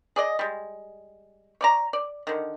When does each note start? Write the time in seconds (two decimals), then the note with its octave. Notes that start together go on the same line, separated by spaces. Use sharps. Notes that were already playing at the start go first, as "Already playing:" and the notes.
0.16 G#4 D5 D#5
0.39 G3 G#3
1.61 C#5 D5 A#5
1.93 D5
2.27 D3 D#3